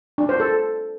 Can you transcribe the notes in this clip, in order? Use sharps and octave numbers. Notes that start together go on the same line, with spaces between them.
D4
C5
A4